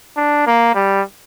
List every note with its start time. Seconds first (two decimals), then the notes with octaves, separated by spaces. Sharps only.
0.17 D4
0.47 A#3
0.75 G3